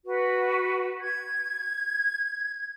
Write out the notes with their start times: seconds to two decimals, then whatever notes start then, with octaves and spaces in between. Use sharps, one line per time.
0.05 F#4 B4
1.00 G#6